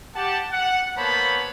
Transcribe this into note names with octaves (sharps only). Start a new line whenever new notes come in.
G4 F#5 A5
F#5
A#3 B3 C5 C#5 A5 B5